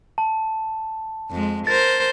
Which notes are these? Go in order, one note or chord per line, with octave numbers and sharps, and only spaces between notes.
A5
F2 G#3
A#4 C5 A6